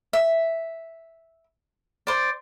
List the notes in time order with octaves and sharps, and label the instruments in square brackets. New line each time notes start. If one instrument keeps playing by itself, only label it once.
[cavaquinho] E5
C5 D5